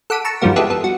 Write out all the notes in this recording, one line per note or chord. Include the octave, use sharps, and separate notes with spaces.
A4 F#5 D6 B6 D#7
A5 A#5 C#6 E6
G2 D#3 F3 G3 A#3 F#4
G#3 B3 E4 G4 A4
B3 A4
F#4